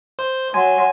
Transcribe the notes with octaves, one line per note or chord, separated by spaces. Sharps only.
C5
F#3 G#5 C6